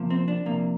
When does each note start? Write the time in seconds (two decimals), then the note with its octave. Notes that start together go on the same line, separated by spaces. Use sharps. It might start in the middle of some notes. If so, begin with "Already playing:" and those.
Already playing: C3 F3 A#3
0.10 C4
0.28 D4
0.46 C3 F3 A#3